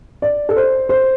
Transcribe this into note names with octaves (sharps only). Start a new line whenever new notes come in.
D5
A4
C5
C5